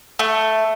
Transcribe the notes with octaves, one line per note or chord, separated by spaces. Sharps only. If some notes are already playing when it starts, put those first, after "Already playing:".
A3